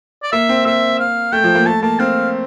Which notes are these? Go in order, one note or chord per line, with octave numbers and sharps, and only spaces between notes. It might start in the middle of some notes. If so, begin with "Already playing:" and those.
D5
A#3 E5
C4
A#3 E5
F5
A3 G5
F3
A#3
A3 A5
A#3 A5
C4 F5